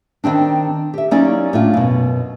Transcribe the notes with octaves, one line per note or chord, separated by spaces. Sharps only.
D#3 A#3 C4 D4
G4 E5
F#3 A#3 C#4 D#4 E4 D5
A2 D4 F4
F#2 B2